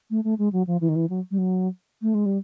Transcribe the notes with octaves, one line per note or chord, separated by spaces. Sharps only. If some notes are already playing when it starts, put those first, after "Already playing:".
A3
A3
G#3
F#3
F3
E3
D#3
E3
F#3
G3
F#3
A3
G#3
G3